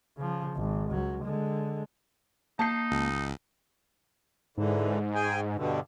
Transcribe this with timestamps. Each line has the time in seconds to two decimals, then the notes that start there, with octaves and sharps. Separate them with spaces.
0.17 C#3 F3
0.56 G#1
0.91 C#2 F#3
1.24 D3 G#3
2.59 A#3 D#4 A5 G6 C7
2.91 C#2
4.57 G#2 D3 E3
5.15 G#4 G5 G#5
5.56 G2 B2 D3